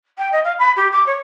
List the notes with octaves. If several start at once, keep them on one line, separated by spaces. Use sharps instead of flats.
G5
D#5
F5
B5
G4
D6
C#5